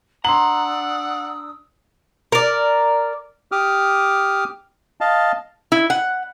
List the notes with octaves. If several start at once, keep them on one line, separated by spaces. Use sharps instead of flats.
D4 F#5 A#5 C6 D#6 E6 F#7
A#4 D5
G4 D6 D#6 F6
D#5 F5 A5
E4
F#5